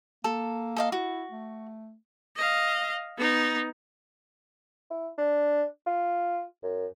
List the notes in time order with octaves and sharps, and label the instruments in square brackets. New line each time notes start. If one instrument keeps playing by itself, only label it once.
[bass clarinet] A#3 [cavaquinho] A4
[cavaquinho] A4 D#5 F5
[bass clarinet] E4 [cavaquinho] F#4
[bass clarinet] A3
[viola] D#5 F5
B3 D#4
[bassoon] E4
D4
F4
F#2